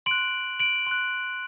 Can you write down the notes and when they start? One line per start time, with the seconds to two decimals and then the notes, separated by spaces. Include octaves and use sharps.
0.06 C6 D7 F#7
0.11 F#6
0.59 D7 F#7
0.87 C6 F#6